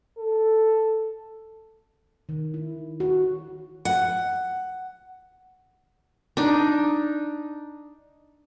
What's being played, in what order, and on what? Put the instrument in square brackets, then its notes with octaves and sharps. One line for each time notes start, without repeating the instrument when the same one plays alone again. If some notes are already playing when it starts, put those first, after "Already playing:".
[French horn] A4
[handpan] D#3
E4
F#4
[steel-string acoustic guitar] F#5
[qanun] D4 D#4